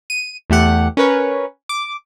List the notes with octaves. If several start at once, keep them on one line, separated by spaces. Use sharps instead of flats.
D#7
E2 A3 G4 F#5
C#4 A#4 B4 C#5
D6